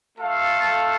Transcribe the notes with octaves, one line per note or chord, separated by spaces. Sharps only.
A3 F4 A4 F5